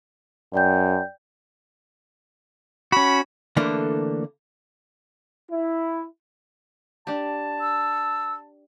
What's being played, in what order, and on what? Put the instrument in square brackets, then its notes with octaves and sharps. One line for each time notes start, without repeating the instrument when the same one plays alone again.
[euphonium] F#2 [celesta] D5 G5 G6
[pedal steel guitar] C#4 F#4 [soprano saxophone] B5
[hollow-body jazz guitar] D3 E3 A3 A#3 D4
[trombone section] E4
[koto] D4 G4 [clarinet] A5
[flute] E6